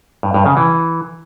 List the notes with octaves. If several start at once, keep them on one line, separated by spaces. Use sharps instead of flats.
G2
G2
C#3
E3